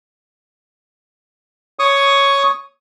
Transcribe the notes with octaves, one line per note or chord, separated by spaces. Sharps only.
C#5 C#6 D#6